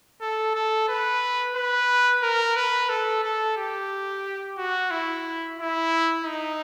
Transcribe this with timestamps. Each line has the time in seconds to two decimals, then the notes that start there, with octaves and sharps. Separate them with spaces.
0.21 A4
0.55 A4
0.88 B4
1.55 B4
2.23 A#4
2.56 B4
2.89 A4
3.23 A4
3.57 G4
4.58 F#4
4.91 E4
5.58 E4
6.25 D#4